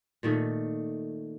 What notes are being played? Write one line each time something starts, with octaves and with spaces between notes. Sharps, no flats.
A#2 D#3 A3